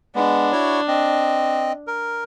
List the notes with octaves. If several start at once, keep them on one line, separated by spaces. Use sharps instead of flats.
G#3 B3 D4
E4 F#4 C#5
C4 D#5
A#4